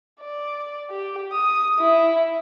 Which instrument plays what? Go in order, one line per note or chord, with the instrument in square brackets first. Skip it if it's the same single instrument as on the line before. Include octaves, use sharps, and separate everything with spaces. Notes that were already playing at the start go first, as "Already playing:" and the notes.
[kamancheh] D5
G4
D#6
E4